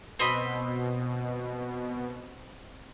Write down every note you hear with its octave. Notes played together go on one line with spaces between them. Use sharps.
B2 C4 D#5 B5